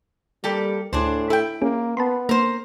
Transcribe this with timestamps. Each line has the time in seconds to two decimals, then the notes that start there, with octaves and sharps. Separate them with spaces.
0.44 G3 A#3 G4 A4
0.93 D2 A2 D4 G#4 C5
1.30 E4 A4 G5
1.62 A#3 C#4 G#4
1.97 B3 A5 B5 C6
2.29 A#3 A#4 C5